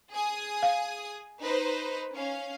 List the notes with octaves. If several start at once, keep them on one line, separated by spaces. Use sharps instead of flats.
G#4 G#5 D#6
F5
D#4 B4 C5
C#4 F5